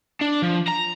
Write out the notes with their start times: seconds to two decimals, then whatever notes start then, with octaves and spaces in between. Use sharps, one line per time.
0.21 D4
0.43 F3
0.68 A#5